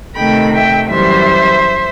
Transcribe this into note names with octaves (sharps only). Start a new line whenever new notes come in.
C3 D#3 A3 G5 B5
E5 G5
F#2 E3 G3 C5 E5